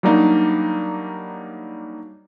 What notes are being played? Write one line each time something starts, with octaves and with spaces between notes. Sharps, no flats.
F#3 G3 A#3 D4 D#4